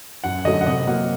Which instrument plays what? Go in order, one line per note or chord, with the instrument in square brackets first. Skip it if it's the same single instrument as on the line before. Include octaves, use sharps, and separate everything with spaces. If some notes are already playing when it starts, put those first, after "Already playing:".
[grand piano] F#2 F#5
D3 F#3 A3 D#5
F#5
C3 D#5
F#3 A#3 F#5